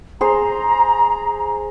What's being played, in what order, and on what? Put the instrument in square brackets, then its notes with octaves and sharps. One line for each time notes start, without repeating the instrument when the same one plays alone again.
[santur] G#4 C5 [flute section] A#5